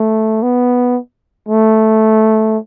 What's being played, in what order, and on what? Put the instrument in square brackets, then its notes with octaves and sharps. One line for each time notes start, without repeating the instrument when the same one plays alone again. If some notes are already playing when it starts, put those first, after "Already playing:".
Already playing: [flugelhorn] A3
B3
A3